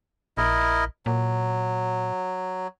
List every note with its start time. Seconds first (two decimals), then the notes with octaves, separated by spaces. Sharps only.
0.37 A#1 E4 A#4 D#5
1.06 A#2 F#3